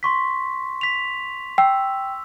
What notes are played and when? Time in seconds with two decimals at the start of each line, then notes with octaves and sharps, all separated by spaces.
0.03 C6 C#6 B6
0.81 B6 F7
1.58 G5 E6